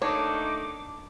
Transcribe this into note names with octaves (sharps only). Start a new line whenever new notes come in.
D#3 A3 A#3 D4 D#4 C#5 D6